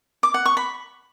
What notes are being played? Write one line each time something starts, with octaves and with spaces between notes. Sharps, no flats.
D6
F#5
C#6
B5